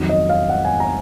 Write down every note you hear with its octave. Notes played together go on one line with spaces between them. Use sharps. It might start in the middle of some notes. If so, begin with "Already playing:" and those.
Already playing: F2 D#3 F#3
D#5
F5
F#5
G#5
A#5